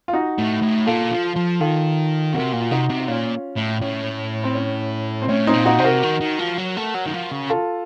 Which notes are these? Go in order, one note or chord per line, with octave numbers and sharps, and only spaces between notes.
F4
D#4 F#4
A2
A2
A#2 F4 A4
F3
F3
D#3 F4 A4
C3 F#4 A#4
A#2
F4
C3 D#4 F#4
C3
F#4
A#2 C#4 F4
A2
A2 C#4
C4
C#4
C4
A2 C#4
C4 D#4
A#2
D#4 F#4
C3 C5
F#4 A#4
D#3
D#3
F3
F#3
A3
F#3
D#3
F3
C#3
F4 A4